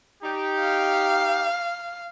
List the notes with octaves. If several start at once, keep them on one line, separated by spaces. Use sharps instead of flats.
D#4 G4
F5